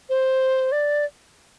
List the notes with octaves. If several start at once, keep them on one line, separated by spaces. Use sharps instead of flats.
C5
D5